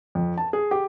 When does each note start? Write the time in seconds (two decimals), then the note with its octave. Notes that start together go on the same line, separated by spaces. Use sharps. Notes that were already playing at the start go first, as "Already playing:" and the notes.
0.15 F2
0.38 A5
0.53 G#4
0.71 G4